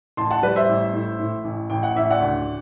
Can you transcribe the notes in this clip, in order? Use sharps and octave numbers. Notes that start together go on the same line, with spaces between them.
A1 A5 C6
F#5 A5
G3 B4 D5
C5 E5
A1
A2
A2
A1
A1 G5
F#5
A1 E5
D5 F#5
D2